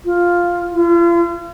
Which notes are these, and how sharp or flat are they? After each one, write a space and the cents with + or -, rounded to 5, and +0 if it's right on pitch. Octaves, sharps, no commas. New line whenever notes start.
F4 +0
F4 -40